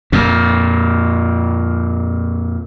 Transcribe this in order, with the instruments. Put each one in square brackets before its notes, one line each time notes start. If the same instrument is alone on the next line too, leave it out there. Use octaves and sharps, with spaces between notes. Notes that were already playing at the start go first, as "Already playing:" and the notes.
[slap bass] F2 A#2